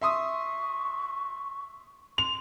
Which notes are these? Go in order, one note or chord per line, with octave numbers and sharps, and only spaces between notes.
E5 C6 C#6 D#6
C6 F7